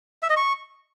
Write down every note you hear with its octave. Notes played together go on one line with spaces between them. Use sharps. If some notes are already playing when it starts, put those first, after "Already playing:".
E5
D#5
C#6